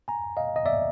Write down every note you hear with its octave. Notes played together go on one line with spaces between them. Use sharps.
G#5 A#5
D#5 F5
D#5
D5 E5